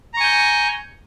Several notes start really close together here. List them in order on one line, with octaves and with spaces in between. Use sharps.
A#5 C#6 G#5 G6